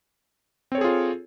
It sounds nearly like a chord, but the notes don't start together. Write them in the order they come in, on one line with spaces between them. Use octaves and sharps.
C4 C#5 A4 G#4 F4